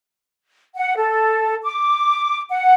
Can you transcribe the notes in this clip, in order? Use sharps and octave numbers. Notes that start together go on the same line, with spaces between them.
F#5
A4
D6
F#5